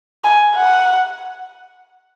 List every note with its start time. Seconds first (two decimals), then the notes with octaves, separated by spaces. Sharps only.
0.24 G#5
0.56 F#5